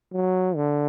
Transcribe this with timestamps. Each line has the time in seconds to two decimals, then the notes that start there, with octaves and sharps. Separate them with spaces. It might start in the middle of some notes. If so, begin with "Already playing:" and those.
0.13 F#3
0.56 D3